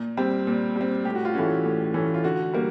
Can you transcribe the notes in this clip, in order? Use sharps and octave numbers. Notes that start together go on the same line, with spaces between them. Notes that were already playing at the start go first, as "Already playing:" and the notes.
Already playing: A#2
G3 C4
A#2
G3 C4
A2 G4
F#4
F4
E3 A3 C#4 F#4
A2
E3 A3 C#4
F4
D3 F#4
G3 A#3